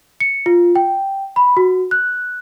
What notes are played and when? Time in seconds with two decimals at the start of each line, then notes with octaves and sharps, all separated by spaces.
0.20 C#7
0.46 F4
0.76 G5
1.36 B5
1.57 F#4
1.91 F#6